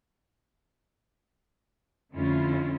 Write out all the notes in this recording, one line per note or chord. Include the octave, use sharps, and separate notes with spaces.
F2 D3 A3 C#4 E4 F4